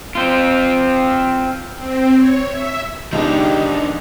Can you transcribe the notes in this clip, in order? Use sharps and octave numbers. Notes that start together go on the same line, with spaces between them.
C4 F4
C4
C#5
E5
C#2 B2 D#3 F3 G#3 D4 D#4 G4